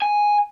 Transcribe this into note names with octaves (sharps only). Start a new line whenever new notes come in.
G#5